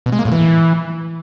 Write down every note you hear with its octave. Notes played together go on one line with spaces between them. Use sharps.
B2
G#3
A#3
A2
E3